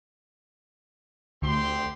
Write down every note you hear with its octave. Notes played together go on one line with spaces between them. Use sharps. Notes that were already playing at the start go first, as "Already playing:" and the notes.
D2 C4 G4 C6